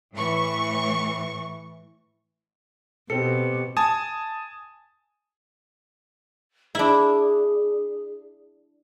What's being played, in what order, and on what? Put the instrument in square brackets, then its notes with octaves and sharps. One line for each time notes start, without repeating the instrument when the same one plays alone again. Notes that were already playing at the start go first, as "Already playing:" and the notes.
[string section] A2 E3 C#6
[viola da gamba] B2 [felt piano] C4 A4 [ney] G4 [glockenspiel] C#7
[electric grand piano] G#5 A5 D#6
[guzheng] D4 E4 [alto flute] G#4